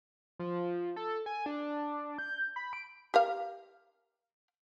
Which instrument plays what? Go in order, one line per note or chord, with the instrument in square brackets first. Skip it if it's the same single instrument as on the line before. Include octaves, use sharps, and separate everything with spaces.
[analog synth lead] F3
A4
G#5
D4
G6
B5
D7
[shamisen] G4 A#4 F5